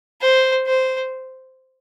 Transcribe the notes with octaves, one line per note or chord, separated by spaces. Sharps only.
C5
C5